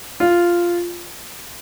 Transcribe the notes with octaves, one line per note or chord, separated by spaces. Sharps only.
F4